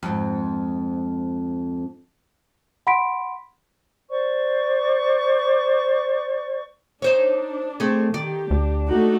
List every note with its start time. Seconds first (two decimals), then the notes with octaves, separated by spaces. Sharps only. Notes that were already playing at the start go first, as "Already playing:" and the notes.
0.03 F2 G#2
2.87 F#5 B5 C6 B6 D7
4.11 C5 D5 C#6
7.02 D4 D#4 C5 C#5
7.80 A3 C4 G#4
8.14 D#3 G4 D5
8.51 D2 D4
8.87 A3 D#4 F#4